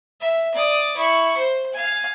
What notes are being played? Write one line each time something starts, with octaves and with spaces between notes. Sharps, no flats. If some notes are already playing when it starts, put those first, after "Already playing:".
E5
D5 D#6
E4 C#6
C5
F5 G#5